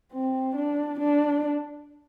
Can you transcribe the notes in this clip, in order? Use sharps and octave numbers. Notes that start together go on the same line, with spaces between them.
C4
D4
D4